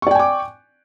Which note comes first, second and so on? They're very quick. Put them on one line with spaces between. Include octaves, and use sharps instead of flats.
C#6 D5 G5 G#5 D6